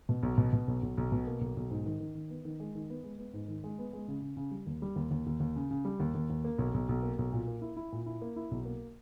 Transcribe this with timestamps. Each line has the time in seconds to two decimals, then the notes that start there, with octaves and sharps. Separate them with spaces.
0.09 B2
0.23 B1
0.38 B2
0.53 B2
0.68 B1
0.83 B1
0.97 B1
1.12 B2
1.27 A#3
1.41 B1
1.57 B1
1.70 G#2
1.86 D#3
2.00 D#3
2.15 D#3
2.30 B3
2.45 D#3
2.60 G#3
2.75 D#3
2.90 B3
3.04 G#3
3.18 B3
3.33 G#2
3.48 D#3
3.64 G#3
3.79 B3
3.93 G#3
4.08 C#3
4.22 C#3
4.37 C#3
4.51 G3
4.66 D#2
4.82 G3
4.96 D#2
5.11 D#2
5.26 D#2
5.40 D#2
5.56 C#3
5.71 C#3
5.85 G3
6.00 D#2
6.14 D#2
6.30 D#2
6.45 A#3
6.58 B1
6.74 B1
6.89 B1
7.03 A#3
7.19 B1
7.32 A#2
7.47 A#3
7.62 E4
7.77 E4
7.92 A#2
8.06 E4
8.22 A#3
8.36 E4
8.51 B1
8.65 A#3